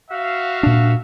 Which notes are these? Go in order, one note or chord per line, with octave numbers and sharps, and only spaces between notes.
F#4 E5 F5
A#2 D4